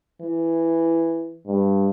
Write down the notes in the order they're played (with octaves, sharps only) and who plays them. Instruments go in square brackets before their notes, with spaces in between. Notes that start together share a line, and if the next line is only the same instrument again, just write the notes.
[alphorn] E3
[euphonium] G2